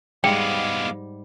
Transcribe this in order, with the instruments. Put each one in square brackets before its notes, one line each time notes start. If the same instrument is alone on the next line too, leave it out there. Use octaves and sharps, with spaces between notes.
[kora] G#2 G3 [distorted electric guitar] G#3 B3 [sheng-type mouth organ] F5 D6 [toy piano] G5